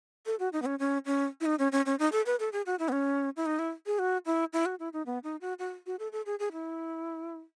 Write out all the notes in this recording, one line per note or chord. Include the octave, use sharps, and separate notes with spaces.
A4
F#4
D#4
B3
C#4
C#4
C#4
E4
D#4
C#4
C#4
C#4
D#4
A4
B4
A4
G#4
F#4
E4
B3
C#4
E4
D#4
E4
G#4
F#4
E4
E4
F#4
E4
D#4
B3
D#4
F#4
F#4
F#4
A4
A4
G#4
G#4
E4